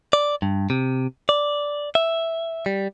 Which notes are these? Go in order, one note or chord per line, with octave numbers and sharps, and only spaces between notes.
D5
G2
C3
D5
E5
G3